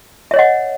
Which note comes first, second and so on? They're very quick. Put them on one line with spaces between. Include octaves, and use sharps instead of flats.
E5 C#5 D#5 F#5